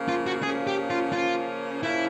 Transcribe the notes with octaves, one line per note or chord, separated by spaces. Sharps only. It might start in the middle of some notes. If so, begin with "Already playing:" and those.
Already playing: C#3 F3 A#3 C#4
F4
F#4
C#3 F3 A#3 C#4 G#4
G4
F4
C#3 F3 A#3 C#4 F4
C#3 F3 A#3 C#4 E4